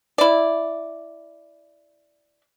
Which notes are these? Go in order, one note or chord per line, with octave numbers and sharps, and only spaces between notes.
E4 D5